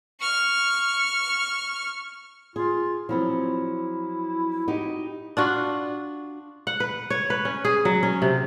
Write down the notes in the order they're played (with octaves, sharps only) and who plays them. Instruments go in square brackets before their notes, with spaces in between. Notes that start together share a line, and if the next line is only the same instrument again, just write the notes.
[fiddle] C#6 F6
[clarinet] F4 [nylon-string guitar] G#4
[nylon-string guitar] F3 F#3 C4 [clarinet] E4
[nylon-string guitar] D#4 F#4 G4
[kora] D4 F4 F#4
F#5
B4
C#5
B4
C#4
G#4
F#3
C#4
C3